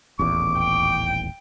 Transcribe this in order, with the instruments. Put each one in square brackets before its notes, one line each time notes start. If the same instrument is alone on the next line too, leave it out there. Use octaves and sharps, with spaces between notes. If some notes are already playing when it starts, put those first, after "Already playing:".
[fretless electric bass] D#1 A1 E2 [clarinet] D6
[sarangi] G5